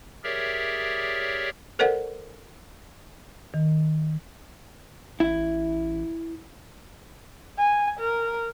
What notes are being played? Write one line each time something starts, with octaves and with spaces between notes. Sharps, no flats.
G4 G#4 A#4 C#5 D5 E5
A4 A#4 C5 D5 F#5
D#3
A1 E4
G#5
A#4